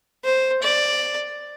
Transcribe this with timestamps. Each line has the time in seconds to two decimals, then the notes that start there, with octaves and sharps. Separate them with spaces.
0.24 C5
0.62 D5